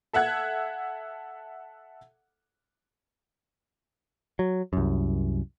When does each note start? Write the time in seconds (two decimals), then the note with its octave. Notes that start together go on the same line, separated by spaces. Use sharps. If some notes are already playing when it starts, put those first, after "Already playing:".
0.13 A4 E5 F#5 F#6 G#6
4.39 F#3
4.73 C2 F#2